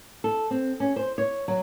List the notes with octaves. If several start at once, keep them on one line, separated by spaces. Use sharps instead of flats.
A4
C4
C#4
C5
C#5
F#3